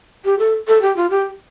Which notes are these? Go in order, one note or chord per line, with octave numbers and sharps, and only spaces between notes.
G4
A4
A4
G4
F4
G4